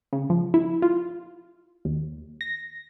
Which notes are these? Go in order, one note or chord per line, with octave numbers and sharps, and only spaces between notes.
C#3
F3
E4
F4
D#2
A#6